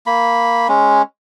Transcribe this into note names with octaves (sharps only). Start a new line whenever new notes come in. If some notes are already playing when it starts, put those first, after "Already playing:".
A#3 B5
G#3 C#4